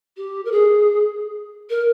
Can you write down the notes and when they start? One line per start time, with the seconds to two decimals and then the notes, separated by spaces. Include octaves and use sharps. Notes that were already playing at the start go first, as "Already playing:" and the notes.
0.17 G4
0.45 A#4
0.52 G#4
1.70 A#4